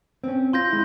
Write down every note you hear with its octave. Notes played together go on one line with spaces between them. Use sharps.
C4 C#4
F4 C6 G6 A#6
G#3 E4